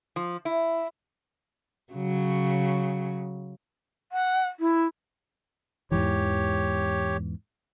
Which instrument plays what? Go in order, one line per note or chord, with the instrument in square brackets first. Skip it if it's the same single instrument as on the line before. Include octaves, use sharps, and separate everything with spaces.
[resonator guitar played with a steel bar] F3
E4
[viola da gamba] C#3 F#3
[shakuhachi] F#5
E4
[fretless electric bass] E2 G#2 E3 [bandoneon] G4 C#5